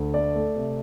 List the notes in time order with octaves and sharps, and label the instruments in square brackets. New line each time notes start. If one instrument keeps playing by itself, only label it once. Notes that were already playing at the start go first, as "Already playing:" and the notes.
Already playing: [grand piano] D2
A3 D5
A3
C3